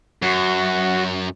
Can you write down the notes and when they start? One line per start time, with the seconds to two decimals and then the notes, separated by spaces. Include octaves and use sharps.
0.22 F#2 F#4